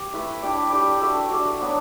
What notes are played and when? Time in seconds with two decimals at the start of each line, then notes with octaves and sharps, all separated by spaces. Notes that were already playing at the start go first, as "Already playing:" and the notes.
Already playing: G4
0.14 A3 E4 B4
0.42 G3 D4 G4 D5
0.72 G3 D4 G4 D5
1.01 D4 F#4 A4 E5
1.30 D4 F#4 A4 E5
1.59 F#3 B3 D4